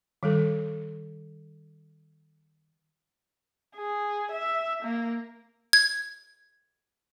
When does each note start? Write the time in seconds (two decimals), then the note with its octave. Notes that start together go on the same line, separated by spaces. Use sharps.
0.23 D#3 G3 A4
3.76 G#4
4.31 E5
4.83 A#3
5.73 G#6